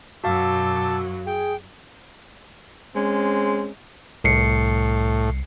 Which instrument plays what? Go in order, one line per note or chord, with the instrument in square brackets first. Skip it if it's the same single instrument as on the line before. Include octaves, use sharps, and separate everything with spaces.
[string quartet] F#2 F#3 [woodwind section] B2 D6 E6 [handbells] F#4 F5 [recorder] A5
[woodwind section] G#4 [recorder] G5
[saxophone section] G#3 C4 C#4
[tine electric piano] C2 C7 C#7 [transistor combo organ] A2